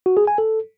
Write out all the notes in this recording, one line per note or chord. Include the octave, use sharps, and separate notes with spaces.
F#4
G#4
G#5
A4